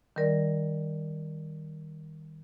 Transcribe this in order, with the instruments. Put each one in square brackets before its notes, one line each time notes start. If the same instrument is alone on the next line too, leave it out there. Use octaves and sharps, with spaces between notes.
[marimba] D#3 G3 A#4 D5